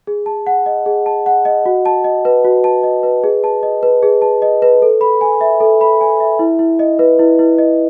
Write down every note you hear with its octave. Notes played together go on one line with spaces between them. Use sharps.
G#4
A5
F#5
D#5
G#4
A5
F#5
D#5
F#4
A5
D#5
B4
F#4
A5
D#5
B4
G#4
A5
D#5
B4
G#4
A5
D#5
B4
A4
B5
G#5
E5
A4
B5
G#5
E5
E4
E4
D#5
B4
E4
E4
D#5